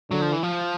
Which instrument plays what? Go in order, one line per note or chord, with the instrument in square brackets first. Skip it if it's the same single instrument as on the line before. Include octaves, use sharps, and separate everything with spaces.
[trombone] D3 [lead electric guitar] F#3
[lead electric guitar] F3
E3
F3